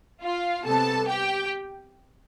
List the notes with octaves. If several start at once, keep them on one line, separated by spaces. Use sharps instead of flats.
F4 F5
C3 G3 B3 A4 A5
G4 G5